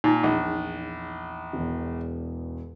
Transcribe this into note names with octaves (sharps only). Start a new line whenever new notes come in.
A#2 D#4
A#1 E2
E1 E2